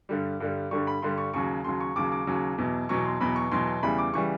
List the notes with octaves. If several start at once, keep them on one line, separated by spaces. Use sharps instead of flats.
G2 D3 G3
G2 D3 G3
G2 D3 G3 C#6
B5
G2 D3 G3 C6
C#6
D#2 C#3 F#3 C#6
D#2 C#3 F#3 C6
C#6
D#2 C#3 F#3 D6
D6
D#2 C#3 F#3
E2 B2 F#3
E2 B2 F#3 C#6
C6
E2 B2 F#3 B5
C#6
E2 B2 F#3 C6
C6
E2 C#3 E3 G3 B5
D6
C#3 E3 G3 C#6